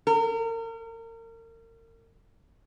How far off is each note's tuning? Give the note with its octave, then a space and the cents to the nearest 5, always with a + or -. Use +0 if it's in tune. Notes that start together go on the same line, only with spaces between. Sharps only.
A#4 -35